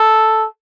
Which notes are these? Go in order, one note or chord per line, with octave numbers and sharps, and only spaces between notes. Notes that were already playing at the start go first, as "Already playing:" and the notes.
Already playing: A4